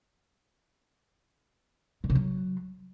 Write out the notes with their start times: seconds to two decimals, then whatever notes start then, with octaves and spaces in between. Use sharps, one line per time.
2.04 B2
2.10 C3
2.15 F#3